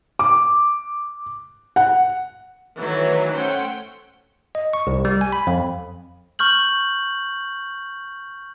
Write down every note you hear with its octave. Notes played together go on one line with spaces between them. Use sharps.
D6
F#5
D#3 E3 F#3 A3
A3 C#4 C5 F#5 G5
D#5
C#6
C2
G3
G#5
B5
F2
C#6 F6 G6 F#7